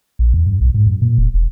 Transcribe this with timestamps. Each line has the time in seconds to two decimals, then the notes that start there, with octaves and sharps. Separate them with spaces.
0.19 A#1
0.34 E2
0.46 G2
0.61 B1
0.74 G#2
0.87 F#2
1.02 A#2
1.18 E1
1.34 E1